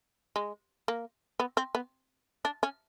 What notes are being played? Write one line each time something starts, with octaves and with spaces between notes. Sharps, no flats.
G#3
A#3
B3
C4
B3
D4
C#4